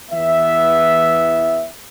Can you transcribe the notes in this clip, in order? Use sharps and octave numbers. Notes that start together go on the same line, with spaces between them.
E2 E3 B3 E5